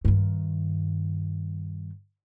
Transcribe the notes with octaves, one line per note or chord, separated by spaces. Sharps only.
G2 D#3